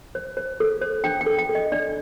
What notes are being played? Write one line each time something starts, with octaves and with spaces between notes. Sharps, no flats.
C5
C5
A4
C5
D4 G5
G5
A4
G5
A4
D#5
D4 D5